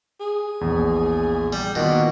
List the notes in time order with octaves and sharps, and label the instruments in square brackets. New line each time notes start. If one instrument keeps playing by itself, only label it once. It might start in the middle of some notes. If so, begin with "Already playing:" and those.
[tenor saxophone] G#4
[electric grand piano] A#1 E2
[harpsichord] G3
[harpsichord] B2 [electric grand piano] D#3 F4 [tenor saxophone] A#3